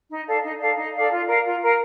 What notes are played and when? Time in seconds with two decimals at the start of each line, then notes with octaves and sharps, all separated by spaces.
0.10 D#4
0.26 A4 D5 F5
0.43 D#4
0.60 A4 D5 F5
0.77 D#4
0.94 A4 D5 F5
1.11 F4
1.27 A#4 F5 A#5
1.44 F4
1.61 A#4 F5 A#5